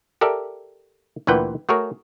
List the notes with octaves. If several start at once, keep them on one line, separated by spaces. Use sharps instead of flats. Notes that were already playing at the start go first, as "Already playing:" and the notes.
G4 A4 A#4 D5 E5
D2 A#2 E3 B4 F#5 G5
A3 F#4 G#4 A#4 C#5